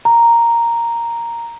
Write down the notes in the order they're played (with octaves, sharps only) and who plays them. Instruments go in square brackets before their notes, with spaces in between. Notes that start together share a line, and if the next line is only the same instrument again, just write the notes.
[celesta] A#5